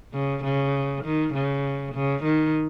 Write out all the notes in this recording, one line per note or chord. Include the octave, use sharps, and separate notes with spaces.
C#3
C#3
D#3
C#3
C#3
D#3